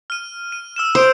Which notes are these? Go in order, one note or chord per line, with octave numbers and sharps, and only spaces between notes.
F6 D#7
D#7
E6 F6 E7
C5 D#6 D7